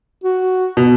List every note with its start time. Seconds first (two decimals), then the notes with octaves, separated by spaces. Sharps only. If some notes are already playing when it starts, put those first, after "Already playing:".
0.24 F#4
0.77 B2